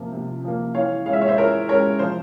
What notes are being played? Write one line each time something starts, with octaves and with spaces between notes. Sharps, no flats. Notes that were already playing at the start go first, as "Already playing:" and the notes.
Already playing: C3 F3 A#3
C3
F3 A#3
E3 C#5 F5
G#3 C#4 F5
E5
C#5
C5 E5
E3 A#4 C#5
G#3 C#4 A#4 C#5
F3 C5